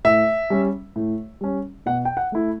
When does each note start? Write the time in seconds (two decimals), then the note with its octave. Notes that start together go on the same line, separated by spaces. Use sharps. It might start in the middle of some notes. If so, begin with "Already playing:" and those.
0.04 A2 E5
0.50 G3 C#4
0.96 A2
1.41 G3 C#4
1.86 B2 F#5
2.05 G5
2.17 F#5
2.32 A3 E4